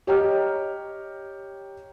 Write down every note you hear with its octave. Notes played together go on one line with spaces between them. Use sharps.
G4 C#5 D#5 G5 A#5 F6